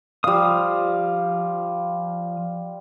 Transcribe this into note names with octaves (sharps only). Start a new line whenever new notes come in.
F3 G3 F5 D#6